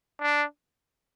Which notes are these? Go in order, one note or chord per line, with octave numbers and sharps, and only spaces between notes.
D4